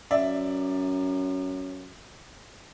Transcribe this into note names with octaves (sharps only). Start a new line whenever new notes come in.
F#2 D5 E5